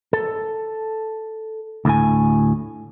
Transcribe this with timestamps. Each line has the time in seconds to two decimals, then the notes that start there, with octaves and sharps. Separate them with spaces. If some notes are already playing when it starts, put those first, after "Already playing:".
0.13 A4
1.85 D2 A2 G#5